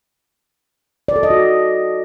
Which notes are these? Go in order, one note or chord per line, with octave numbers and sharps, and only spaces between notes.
D5
A4
D#5
F#4